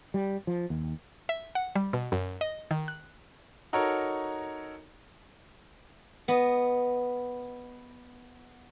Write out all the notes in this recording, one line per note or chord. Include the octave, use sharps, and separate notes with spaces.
G3
F3
D#2
E5
F#5
G3
B2
F#2
D#5
D#3
F#6
D#4 F#4 A4 A#4 C#5
B3 D#5